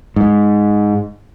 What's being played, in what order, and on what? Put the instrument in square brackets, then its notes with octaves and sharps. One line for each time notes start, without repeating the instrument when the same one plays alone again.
[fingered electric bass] G#2